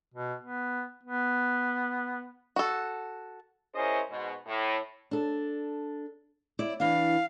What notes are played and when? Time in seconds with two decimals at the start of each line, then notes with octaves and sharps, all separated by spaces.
0.14 B2
0.42 B3
1.03 B3
2.56 F#4 A4
3.74 C#4 E4 G#4 A#4 C5 D#5
4.09 G#2 B2
4.47 A2
5.11 D4 A4
6.59 E4 D5
6.80 E3 D4 F5